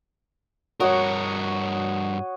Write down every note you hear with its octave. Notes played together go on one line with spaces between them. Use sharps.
G2 F#4 A#4 C#5 D#5